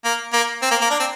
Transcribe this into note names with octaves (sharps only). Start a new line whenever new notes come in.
A#3
A#3
C4
A#3
A#3
D4
C4